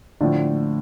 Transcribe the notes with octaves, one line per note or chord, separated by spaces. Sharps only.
A2 D3 F3 A3 D4 F4